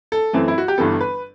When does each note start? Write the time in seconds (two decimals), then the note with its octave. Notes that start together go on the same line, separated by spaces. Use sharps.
0.12 A4
0.33 F#2 E3 A3 C4
0.48 E4
0.58 F#4
0.68 G4
0.78 G1 G2 E3 B3 A4
1.01 B4